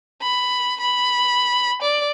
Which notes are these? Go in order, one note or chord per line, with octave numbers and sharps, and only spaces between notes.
B5
B5
D5